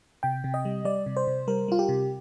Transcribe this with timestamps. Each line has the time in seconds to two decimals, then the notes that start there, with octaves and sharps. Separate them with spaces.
0.23 C3 G5
0.44 C3
0.54 D#5
0.65 G3
0.85 G3 D5
1.06 C3
1.17 C5
1.27 C3
1.48 G3 A#4
1.68 G3 F4
1.79 G4
1.89 C3